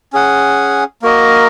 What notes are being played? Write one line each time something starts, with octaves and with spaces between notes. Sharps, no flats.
C#4 G#4 F#5
A#3 F#4 A#4 D#5